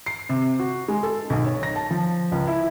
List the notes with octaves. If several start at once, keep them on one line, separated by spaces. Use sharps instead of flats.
C7
C3
F#4
G#3
A4
B1
C#5
A#6
A5
F3
C#2
E4